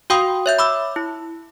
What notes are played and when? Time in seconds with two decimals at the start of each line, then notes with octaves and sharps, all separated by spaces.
0.10 F#4 F5 G5 C6 D#6
0.46 C#5 E5 G6
0.59 B5 D6 E6
0.96 E4